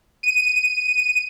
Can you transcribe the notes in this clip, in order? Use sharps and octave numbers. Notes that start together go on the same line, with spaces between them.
D#7